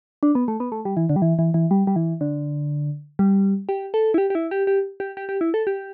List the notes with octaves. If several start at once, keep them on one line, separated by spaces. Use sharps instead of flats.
D4
B3
A3
B3
A3
G3
E3
D3
G3
E3
E3
E3
G3
G3
E3
D3
G3
G4
A4
E4
G4
G4
E4
G4
G4
G4
G4
G4
E4
A4
G4